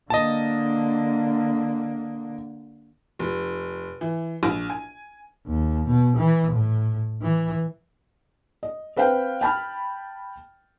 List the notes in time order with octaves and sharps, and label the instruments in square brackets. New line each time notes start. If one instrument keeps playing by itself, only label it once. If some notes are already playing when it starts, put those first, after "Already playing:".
[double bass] D3 A#3 [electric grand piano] D#5 A5
[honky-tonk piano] F1
E3
A#1
G#5
[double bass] D#2
B2
E3
A2
E3
[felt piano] D#5
C4 B4 C5 F5 G5
G5 A5 B5 F6